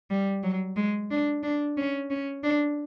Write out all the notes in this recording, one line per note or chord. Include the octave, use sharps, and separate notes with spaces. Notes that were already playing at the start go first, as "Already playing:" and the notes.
G3
F#3
G#3
D4
D4
C#4
C#4
D4